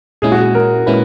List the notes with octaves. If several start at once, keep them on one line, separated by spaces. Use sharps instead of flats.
A#2 G#3 C#4 E4 G#4
F#4
G#4
A#4
A#2 G#3 C#4 E4 B4